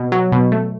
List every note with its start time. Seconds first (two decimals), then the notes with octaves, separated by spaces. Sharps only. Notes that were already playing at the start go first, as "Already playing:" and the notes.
Already playing: B2
0.12 F#3
0.32 B2
0.52 A3